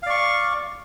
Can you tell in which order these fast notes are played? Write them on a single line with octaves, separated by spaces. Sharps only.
F5 D5 C#6